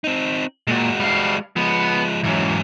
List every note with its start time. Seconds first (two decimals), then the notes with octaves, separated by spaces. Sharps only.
0.04 C4 D#4
0.67 A#2 G#3 F#4
1.00 G3 F5
1.56 F3 G#3 B3
2.24 G#2 E3 F#3 C#4